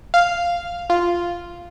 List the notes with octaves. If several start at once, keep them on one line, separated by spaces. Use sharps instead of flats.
F5
F4